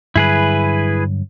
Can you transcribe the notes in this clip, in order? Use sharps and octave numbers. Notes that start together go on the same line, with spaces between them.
G2 D3 F#3 E4 G#4 B4